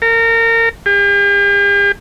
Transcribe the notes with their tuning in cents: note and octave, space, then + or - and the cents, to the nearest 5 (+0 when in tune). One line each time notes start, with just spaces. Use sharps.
A#4 -30
G4 +45